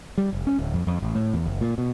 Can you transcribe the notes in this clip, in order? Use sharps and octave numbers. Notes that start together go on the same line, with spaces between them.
G3
F1
C#4
D1
F2
F2
A1
A2
E2
F#1
A#2
B2